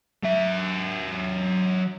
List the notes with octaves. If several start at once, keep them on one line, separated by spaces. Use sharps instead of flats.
F#3 E5